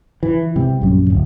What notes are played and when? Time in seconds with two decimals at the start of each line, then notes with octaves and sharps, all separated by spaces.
0.23 E3
0.56 C3 G3
0.81 A#1 F#2
1.10 D1